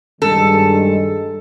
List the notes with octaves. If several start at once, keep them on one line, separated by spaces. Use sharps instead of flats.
G2 D#3 G#3 A4